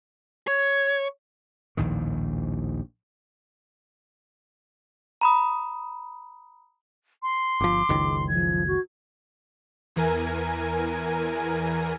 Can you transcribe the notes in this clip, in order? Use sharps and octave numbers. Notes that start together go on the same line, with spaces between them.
C#5 G#6
A#1 D#2 A2 D#3
A#5 B5 D#6
C6
G1 F3 D6
F#1 C#2 D#3
F3 G#6
F#4
E2 E3 A#4 G#5